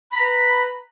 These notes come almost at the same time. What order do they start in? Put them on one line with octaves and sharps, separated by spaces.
B5 A#5 B4